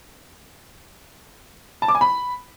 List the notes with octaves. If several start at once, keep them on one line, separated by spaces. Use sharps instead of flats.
A5
D6
G#5
B5